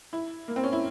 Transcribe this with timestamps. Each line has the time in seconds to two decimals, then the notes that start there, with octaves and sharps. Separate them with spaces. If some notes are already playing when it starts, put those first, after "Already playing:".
0.13 E4
0.48 A#3
0.56 C4
0.63 C#4
0.73 E4